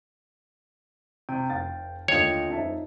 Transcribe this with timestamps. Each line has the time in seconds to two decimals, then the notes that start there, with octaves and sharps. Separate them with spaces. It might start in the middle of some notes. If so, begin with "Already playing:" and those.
1.29 C3 G5
1.50 F1 F5 A6
2.08 D#2 D3 A3 F4 C#5 D#5 G5
2.50 F2 C#4 D#4 E5 A5